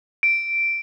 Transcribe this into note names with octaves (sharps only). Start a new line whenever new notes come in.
D7